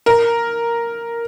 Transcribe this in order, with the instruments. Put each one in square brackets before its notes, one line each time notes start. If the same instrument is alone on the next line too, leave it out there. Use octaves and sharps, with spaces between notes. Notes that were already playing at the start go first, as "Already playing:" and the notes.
[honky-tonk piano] A#4